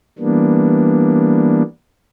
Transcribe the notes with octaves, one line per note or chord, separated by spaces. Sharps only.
E3 G3 A#3 B3 D4